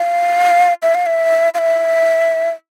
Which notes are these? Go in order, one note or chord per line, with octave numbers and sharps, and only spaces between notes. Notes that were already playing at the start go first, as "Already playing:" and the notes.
Already playing: F5
E5
F5
E5
F5
E5